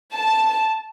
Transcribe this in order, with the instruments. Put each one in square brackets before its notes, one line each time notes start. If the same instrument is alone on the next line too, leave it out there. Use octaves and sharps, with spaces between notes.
[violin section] A5